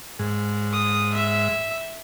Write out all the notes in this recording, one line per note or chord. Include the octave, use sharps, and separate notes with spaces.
G#2
D#6
E5